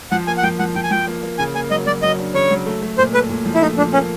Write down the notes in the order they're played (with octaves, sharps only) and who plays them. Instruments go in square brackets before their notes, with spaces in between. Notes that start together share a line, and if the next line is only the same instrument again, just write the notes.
[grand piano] F3 [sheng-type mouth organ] F#5
[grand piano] A#3 [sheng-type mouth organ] G#5
[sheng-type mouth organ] F#5
[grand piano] F3 [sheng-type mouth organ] G5
[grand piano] F3 [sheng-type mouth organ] F#5
[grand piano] F3 [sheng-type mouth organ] G5
[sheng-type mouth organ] G#5
[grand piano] F3 [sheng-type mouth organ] G5
[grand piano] A#3
A#3
[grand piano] C#3 [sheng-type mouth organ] G#5
[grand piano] A#3 [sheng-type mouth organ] G#5
[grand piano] F#3 [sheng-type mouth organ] D#5
[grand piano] F#3 [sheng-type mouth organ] D5
[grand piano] F#3 [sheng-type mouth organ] D#5
[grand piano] D4
[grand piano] C#3 [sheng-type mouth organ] C#5
[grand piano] F#3
A3
A3
[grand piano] A#2 [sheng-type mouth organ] C5
[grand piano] A3 [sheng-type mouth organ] B4
[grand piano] A#2
F3
[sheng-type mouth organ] E4
[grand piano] A3 [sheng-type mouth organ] D#4
[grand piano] F3 [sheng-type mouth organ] D4
[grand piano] A#3 [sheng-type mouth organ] C#4